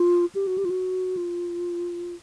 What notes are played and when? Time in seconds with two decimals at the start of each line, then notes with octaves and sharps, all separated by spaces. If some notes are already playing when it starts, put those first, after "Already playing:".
Already playing: F4
0.35 G4
0.47 F#4
0.58 G4
0.65 F4
0.70 F#4
1.17 F4